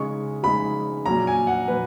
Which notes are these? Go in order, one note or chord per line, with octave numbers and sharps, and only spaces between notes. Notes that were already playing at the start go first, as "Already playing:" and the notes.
Already playing: C#3 G#3 D#4 C#6
C#3 G#3 D#4 B5
A#2 F#3 C#4 A#5
G#5
F#5
A#2 F#3 B4